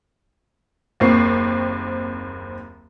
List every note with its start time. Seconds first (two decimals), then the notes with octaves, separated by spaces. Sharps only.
1.00 F#1 D#2 C4 C#6 C7